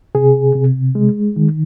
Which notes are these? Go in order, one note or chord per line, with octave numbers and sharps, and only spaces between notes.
C3 G#4
C3
G#3
D#3